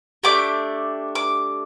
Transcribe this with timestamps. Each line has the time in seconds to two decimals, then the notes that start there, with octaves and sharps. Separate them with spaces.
0.23 A3 D4 G4 D6
1.15 D6